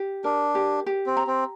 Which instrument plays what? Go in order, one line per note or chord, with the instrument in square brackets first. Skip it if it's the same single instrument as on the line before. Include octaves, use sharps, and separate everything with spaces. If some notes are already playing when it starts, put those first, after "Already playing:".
Already playing: [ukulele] G4
[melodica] D4 [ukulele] A#4
[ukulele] G4
G4
[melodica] C4
[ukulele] A#5
[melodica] C4